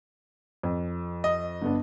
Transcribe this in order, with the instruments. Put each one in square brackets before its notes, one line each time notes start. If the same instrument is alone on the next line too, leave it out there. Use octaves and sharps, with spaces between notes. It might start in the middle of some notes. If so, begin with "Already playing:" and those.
[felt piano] F2
[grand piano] D#5
[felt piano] G1 B3 D4